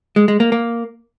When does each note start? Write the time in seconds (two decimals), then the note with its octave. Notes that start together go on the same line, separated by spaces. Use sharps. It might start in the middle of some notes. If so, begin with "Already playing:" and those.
0.16 G#3
0.28 G#3
0.40 A#3
0.52 A#3